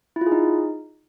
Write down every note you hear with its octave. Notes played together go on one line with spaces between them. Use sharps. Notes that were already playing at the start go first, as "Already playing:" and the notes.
E4
F4
G#4
D#4